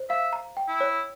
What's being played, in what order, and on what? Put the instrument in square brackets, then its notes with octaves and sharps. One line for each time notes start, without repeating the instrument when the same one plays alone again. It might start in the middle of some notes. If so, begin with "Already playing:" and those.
Already playing: [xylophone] C5
[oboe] E5 [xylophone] F5
[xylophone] A#5
G5
[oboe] E4
[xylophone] C#5